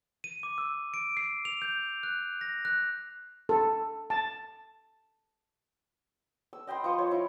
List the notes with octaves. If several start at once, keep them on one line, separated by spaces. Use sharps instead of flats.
D#7
D6
E6
D7
C7
F7
G6
F#6
A#6
F#6
A4
A5
E6
D#5 G5 B5 C6
F3 C5 C#6
C#5
E4 F4